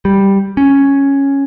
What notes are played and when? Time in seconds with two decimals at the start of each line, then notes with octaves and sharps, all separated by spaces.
0.05 G3
0.57 C#4